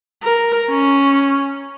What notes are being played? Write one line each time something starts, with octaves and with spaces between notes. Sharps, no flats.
A#4
C#4